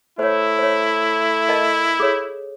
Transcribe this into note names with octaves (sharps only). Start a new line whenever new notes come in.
A3 E4 C5 C#5
C5 C#5
A#4 D#5 A5
G#4 A4 C#5